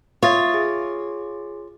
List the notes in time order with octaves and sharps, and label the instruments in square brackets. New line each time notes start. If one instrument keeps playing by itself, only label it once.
[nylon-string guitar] F4 C#5 [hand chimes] E5 D#6 A6
[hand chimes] G#4